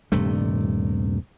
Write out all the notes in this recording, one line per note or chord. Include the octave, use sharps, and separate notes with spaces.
D#1 G2 C3 A3